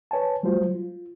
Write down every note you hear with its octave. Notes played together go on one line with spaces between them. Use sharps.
B4 C#5 G#5 A5
F#3 G3 A3 F4 F#4 C5
F4